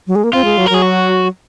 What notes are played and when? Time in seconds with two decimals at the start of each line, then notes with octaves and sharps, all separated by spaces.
0.07 F#3
0.15 G#3
0.24 A#3
0.33 C4 F4
0.45 G#3
0.58 F#3
0.66 A#4
0.70 F#3 G#4
0.82 F#4